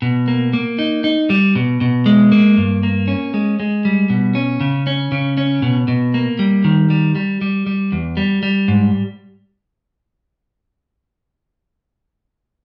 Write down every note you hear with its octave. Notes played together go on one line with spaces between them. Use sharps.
B2
A#3
A#3
D#4
D#4
G3
B2
B2
G#3
A#3
G2
A#3
C#4
G#3
G#3
G3
B2
C#4
C#3
C#4
C#3
C#4
B2
B2
A#3
G3
D#3
G3
G3
G3
G3
E2
G3
G3
G#2